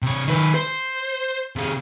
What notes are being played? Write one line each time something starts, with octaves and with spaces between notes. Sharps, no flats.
C3 C#5
D#3 B4
C5
C3 G#4